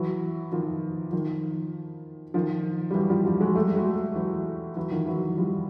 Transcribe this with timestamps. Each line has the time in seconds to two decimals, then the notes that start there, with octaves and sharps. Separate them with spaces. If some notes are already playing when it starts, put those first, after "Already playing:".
Already playing: E3 F#3
0.52 D#3 F3
1.12 D#3 F3
2.34 D#3 F3
2.91 G3
2.94 E3 F#3
3.10 F3 G3
3.25 F3 G3
3.40 F#3 G#3
3.55 G3 A3
3.76 F#3 G#3
4.15 E3 F#3
4.77 E3 F#3
4.91 D#3 F3
5.07 E3 F#3
5.38 F3 G3